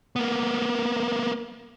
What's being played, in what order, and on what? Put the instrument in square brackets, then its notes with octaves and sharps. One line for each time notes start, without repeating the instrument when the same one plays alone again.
[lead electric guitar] A#3 B3